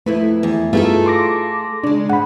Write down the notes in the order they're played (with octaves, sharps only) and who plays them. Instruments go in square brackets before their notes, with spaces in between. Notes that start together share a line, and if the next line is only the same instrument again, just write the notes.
[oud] F2 E4 B4 [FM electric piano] A3
[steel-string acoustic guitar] E2
[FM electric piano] G2 [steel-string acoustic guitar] A3 G#4 A4 [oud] D#4 F4 B4
[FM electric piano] C6 D6 A#6
[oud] C#3 G#3 [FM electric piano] D4
[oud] G#2 [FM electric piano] F#5 B5